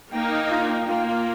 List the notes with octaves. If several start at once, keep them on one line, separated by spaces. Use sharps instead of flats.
A#3 D#4 G5
D#5
F4
G5
A#3 F4
F4